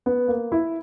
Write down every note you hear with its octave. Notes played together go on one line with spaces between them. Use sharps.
B3
A#3
E4